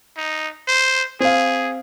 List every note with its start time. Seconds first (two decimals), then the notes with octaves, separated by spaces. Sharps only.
0.17 D#4
0.68 C5
1.20 C4 G#4 F5